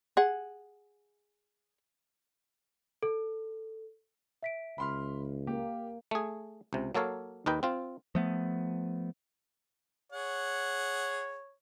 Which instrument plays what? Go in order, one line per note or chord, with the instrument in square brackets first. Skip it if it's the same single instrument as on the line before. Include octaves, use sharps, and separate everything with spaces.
[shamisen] G#4 F#5
[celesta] A4
E5 B6 D7
[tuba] C#2 [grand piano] B5 C6 F6
[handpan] A#3 [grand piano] G4
[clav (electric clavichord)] A3 G#4
C#2 C3
F#3 A#3 A4 C#5 F5
D#2 D#4 A#4 B4 G5
C4 F4
[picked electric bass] F3 A3 B3
[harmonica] G#4 F#5 [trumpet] C#5